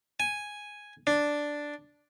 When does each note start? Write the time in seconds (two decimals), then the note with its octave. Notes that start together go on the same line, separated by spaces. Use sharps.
0.20 G#5
1.07 D4